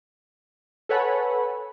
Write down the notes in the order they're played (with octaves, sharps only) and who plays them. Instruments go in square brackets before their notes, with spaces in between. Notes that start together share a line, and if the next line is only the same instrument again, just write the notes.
[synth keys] A4 B4 C#5 F#5 G#5 B5